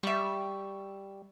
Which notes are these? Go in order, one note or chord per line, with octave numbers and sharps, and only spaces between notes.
G3 E5 C#6